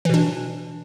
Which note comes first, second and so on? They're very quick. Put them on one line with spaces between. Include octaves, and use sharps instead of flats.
E3 B2 D4